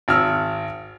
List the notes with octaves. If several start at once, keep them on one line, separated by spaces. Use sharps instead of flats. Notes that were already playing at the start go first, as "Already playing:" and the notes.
G#1 E6 F6